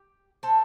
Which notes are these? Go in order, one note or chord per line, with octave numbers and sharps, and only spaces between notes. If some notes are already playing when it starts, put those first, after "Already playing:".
Already playing: G4
A4 C5